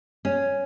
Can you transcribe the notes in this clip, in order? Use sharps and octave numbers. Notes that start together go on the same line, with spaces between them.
C#4